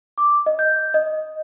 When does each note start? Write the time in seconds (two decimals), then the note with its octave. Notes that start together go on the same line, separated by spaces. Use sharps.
0.18 D6
0.46 D#5
0.59 G6
0.94 D#5